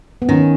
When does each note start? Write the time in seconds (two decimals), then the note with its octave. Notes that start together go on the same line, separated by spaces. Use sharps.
0.22 B3
0.29 D#3 C#4